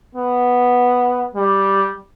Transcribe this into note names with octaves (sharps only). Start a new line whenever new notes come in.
B3
G3